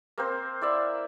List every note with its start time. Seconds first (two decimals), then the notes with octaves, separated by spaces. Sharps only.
0.18 A#3 C4 C5
0.61 E4 D5 E5